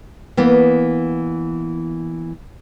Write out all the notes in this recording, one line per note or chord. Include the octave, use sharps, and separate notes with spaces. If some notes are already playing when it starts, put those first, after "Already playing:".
E3 A#3 B3